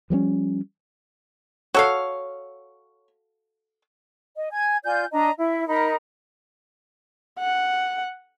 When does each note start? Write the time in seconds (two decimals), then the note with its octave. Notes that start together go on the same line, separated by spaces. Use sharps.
0.10 F3 G3 A#3 C#4
1.74 F#4 A4 C#5 F5
4.35 D#5
4.51 G#5 G#6
4.84 F4 D5 G#5 G6
5.11 D4 D#5 A#5
5.38 E4
5.67 D#4 A#4 A#5 B5
7.39 F#5